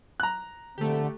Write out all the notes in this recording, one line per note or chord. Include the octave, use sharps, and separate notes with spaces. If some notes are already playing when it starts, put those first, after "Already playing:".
A#5 F#6
A#1 D3 A3 C4 G4 A4